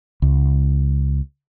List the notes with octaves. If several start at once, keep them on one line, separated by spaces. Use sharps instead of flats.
C#2